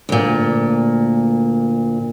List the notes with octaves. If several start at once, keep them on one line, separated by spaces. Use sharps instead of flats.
D2 A#2